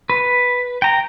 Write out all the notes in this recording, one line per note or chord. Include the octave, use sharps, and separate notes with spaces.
B4
G5 A#5